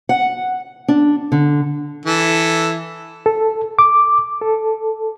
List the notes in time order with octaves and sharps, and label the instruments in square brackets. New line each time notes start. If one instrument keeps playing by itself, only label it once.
[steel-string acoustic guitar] F#5
D4
D3
[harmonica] E3 A4
[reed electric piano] A4
D6
A4